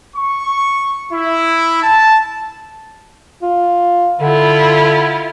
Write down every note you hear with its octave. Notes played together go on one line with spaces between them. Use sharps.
C#6
E4
A5
F4
D3 E4 F4